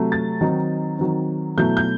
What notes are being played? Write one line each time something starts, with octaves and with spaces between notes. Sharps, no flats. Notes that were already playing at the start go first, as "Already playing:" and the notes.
Already playing: C3 F#3 A3
A6
D#3 F#3 C4 D#4
D#3 F#3 C4
B2 F#3 A3 E4 G6
G6